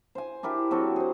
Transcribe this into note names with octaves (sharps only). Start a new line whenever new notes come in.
C5 G#5
D4 E4 G4 A#4
F#3 C4 A4
G#4 C5